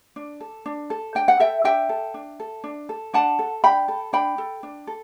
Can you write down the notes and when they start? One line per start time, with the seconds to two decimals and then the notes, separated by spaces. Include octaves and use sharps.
0.16 D4
0.41 A4
0.66 D4
0.90 A4
1.15 D4 G5
1.28 F#5
1.40 A4 E5 G5
1.64 D4 E5 G5
1.89 A4
2.14 D4
2.40 A4
2.64 D4
2.89 A4
3.14 D4 F#5 A5
3.39 A4
3.64 D4 G5 B5
3.88 A4
4.13 D4 G5 B5
4.38 A4
4.63 D4
4.87 A4